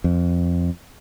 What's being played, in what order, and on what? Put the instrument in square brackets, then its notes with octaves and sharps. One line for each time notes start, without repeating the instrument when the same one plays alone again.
[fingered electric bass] F2